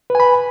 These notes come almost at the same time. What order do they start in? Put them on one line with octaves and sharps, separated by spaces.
B4 G#5 B5